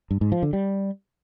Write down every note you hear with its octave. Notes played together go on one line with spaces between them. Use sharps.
G2
G#2
F3
D3
G3